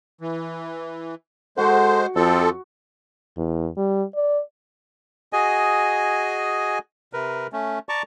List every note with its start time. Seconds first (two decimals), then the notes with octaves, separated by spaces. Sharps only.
0.21 E3
1.57 G#3 F#4 A4 C5
2.15 F2 F3 A4
3.37 E2
3.77 G3
4.15 D5
5.33 F#4 G#4 D#5 G#5
7.13 C3 A#4 B4
7.52 A3 C#4
7.89 D5 A5 A#5 C#6 D6